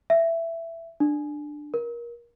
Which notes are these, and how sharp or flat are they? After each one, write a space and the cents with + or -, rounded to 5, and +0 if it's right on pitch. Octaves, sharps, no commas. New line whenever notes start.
E5 +10
D4 +15
A#4 +25